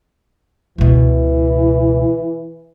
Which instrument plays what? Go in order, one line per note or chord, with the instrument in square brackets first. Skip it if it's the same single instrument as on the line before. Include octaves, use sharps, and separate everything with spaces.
[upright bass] C#2 B2 [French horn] E3